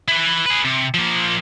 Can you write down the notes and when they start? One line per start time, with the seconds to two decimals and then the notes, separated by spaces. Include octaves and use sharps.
0.08 E4 B4
0.46 G#4 B4
0.65 C3
0.94 F3 A#3